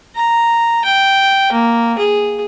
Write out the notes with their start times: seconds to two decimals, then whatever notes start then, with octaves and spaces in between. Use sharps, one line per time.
0.16 A#5
0.85 G5
1.53 A#3
1.98 G#4